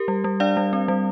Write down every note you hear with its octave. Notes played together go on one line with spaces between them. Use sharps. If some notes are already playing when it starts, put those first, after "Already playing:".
Already playing: G4 A#4
G3
G3
D4 D5 F5
G3
C4
G3